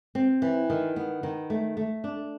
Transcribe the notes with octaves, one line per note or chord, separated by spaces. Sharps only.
C4
E3
D#3
B3
D#3
A3
A3
D4